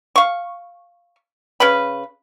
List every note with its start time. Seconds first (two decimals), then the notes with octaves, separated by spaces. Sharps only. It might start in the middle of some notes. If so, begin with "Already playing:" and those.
0.16 F5 C#6
1.60 C#3 B4 B5